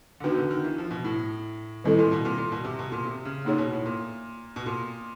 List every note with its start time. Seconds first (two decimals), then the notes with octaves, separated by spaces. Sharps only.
0.20 D3
0.24 D#3 B3 D4 F#4 B4
0.38 D3
0.51 D#3
0.64 E3
0.78 F3
0.91 B2
1.04 A2
1.84 A2 D#3 G3 C4 E4 A4
1.99 A#2
2.12 B2
2.25 A#2
2.38 A#2
2.52 B2
2.64 C3
2.79 B2
2.92 A#2
3.05 C3
3.25 C#3
3.45 A#2 A#3 D#4 G#4 C#5
3.58 B2
3.72 A2
3.86 A#2
4.56 B2
4.66 A#2